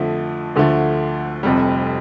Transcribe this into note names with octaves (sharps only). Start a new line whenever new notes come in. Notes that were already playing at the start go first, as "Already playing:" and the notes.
Already playing: F2 D3 F3 A3
D2 D3 F3 A3
F1 F2 C3 G3